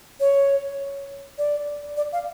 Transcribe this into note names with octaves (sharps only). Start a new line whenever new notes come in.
C#5
D5
D5
F5